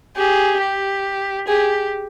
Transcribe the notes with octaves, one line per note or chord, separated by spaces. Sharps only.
G4 G#4
G4
G4 G#4